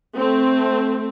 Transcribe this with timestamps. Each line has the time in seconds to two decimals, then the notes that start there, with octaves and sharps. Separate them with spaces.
0.16 A3 C4